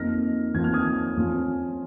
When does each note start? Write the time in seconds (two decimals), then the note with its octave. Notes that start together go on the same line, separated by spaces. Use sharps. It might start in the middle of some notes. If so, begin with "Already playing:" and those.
Already playing: F2 F3 A#3 D#4 F6 A#6
0.54 F2 F3 A#3 D#4 G#6
0.64 F6
0.74 D#6 G#6
1.17 F2 F3 C#4 F4